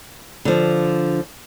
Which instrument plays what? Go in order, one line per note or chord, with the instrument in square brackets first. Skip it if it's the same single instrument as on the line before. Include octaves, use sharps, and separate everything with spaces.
[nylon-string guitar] D3 F3